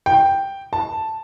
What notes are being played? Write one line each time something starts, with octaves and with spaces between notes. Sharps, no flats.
G5
A5